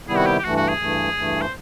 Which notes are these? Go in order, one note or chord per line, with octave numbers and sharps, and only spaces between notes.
C3 D#3 G3 B3 E4 G#4
F#4
G4
G4
G2 E3 A3 F#4
F#4
G#4
G2 E3 A3
G2 E3 A3
C5